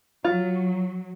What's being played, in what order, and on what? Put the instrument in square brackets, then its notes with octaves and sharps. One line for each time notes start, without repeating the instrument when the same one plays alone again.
[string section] F#3 [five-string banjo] F4